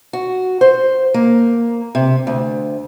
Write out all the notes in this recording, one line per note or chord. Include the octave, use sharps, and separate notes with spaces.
F#4
C5
A#3
C3
D2